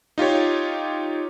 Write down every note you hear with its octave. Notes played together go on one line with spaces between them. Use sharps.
D#4 F4 G4 C#5